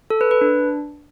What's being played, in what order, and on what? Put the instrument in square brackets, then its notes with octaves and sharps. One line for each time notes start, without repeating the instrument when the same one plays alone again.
[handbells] A4
B4
B4
D4